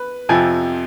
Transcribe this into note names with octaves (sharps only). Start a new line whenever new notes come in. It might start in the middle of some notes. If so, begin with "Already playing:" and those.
Already playing: B4
F2 C3 F3 G#5